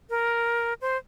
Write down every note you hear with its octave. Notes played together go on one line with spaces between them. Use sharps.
A#4
C5